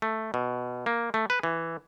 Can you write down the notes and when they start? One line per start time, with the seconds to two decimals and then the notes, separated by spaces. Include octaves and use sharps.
0.02 A3
0.34 B2
0.86 A#3
1.14 A3
1.30 B4
1.43 E3